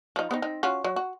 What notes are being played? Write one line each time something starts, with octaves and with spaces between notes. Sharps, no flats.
F3 D#4
B3 C4 D#4
C4 D#4
C#4 F4 F#4
F#3 F#4
F#4